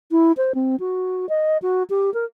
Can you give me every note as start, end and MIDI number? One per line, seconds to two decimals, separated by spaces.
0.11 0.32 64
0.37 0.53 72
0.55 0.76 60
0.80 1.29 66
1.29 1.58 75
1.62 1.83 66
1.90 2.13 67
2.14 2.25 70